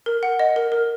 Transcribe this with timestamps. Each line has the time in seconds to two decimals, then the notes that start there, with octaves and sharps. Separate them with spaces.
0.06 A#4
0.23 F#5
0.39 D#5
0.56 A#4
0.72 A#4